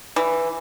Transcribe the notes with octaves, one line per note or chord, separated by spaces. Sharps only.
E3